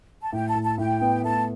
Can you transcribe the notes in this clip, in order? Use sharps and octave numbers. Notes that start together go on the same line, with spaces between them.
A5
A2 G5
A5
A2
A5
A2 G5
B3
A3 A5